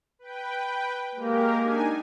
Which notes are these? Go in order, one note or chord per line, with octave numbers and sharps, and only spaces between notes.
B4 G5
G#3 A#3 G4 A#4
D4 D#4 G#5